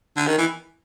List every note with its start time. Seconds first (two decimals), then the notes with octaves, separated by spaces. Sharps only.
0.16 D3
0.27 D#3
0.38 E3